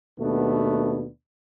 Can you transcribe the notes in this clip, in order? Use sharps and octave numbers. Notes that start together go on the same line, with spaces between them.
D#2 B2 A3 B3 D4